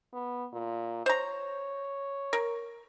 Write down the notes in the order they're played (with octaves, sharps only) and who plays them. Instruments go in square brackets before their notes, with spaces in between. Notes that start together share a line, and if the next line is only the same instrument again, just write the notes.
[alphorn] B3
A#2
[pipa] C5 A#5 [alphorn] C#5
[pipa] A#4